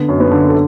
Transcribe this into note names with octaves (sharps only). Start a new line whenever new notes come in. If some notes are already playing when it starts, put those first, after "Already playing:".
Already playing: D3 B3
F#2
B3 B4
D3
A4